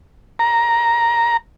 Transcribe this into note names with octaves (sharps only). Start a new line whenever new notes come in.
A#5